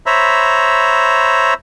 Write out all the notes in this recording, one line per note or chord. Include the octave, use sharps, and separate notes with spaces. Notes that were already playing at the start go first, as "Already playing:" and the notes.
C5 C#5 E5 A#5 B5